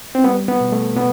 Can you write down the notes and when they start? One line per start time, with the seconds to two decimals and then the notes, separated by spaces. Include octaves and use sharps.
0.15 C4
0.24 G3 B3
0.48 B3
0.61 B2
0.72 A3
0.95 B2 B3